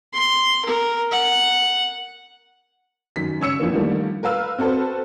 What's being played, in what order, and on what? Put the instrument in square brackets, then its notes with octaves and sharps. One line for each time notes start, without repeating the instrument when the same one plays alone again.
[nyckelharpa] C6
A#4
F#5
[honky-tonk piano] F#2 D#3 B6
C#3 C#5 E6 C#7 E7
F2 D3 E3 A#3
D3 D#3 F3 G3 A3 A#3
A#4 B4 F5 E6 F6
C4 F#4 A4 B4 C5